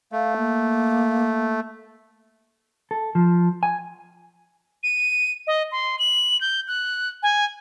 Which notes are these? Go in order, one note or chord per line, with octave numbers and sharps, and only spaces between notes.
A3 F5
A#3
A4
F3
G#5
D#7
D#5
C6
F#7
G6
F#6
G#5